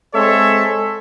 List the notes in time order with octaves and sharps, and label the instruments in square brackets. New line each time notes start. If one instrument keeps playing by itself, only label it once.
[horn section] G#3 C4 A4 C#5 E5